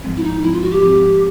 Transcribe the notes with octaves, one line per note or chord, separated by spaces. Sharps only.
G#2 F3 G#3 C4
E4
D#4
G#2 F3 G#3 C4 E4
F4
F#4
G4
G#2 F3 G#3 C4